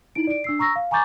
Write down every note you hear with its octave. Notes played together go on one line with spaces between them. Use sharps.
D#4 E4 D7
D5 D7
D4 E6 C7
A#5 C#6 E6 A#6
F5
G#5 A#5 C#6 D6 G6 A6